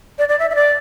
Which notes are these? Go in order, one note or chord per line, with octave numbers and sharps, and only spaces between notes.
D5
D5
E5
E5
D5